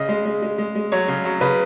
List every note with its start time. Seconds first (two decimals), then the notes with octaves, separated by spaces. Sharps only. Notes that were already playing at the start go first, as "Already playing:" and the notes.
Already playing: C#3 D#5
0.09 G#3
0.25 G#3
0.42 G#3
0.58 G#3
0.75 G#3
0.92 F#3 C#5
1.08 C#3
1.25 F#3
1.41 C#3 B4